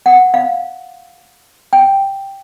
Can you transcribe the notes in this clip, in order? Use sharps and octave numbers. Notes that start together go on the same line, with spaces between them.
F#5
F5
G5